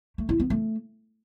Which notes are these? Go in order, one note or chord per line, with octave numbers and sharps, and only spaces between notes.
A3
E4
B3
A3